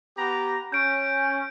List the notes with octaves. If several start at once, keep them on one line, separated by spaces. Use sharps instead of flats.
B3 G4 A#5
C#4 G6 D7